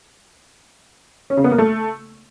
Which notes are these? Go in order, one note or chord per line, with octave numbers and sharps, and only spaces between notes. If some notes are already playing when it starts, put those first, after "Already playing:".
C#4
C#3
B3
A#3
A3